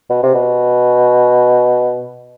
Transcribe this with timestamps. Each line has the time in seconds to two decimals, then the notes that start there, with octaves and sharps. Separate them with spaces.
0.10 B2
0.23 C3
0.34 B2